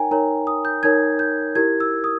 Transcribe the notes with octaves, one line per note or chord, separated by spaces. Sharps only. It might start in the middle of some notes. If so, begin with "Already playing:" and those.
Already playing: D#4 A#4 C#5 G5 G#5 A#5
D#4 A#4 C#5 A#5
D#6
G6
D#4 A#4 C#5 G#6
G6
E4 G4 A#4 G#6
E6
D#6